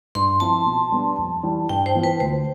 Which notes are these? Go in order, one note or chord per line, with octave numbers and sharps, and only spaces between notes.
G2 C6
F3 C4 E4 A5
B2
G3 B3 D4
F2
E3 G3
G2 G5
C5
E3 B3 F4
B4
D2 C5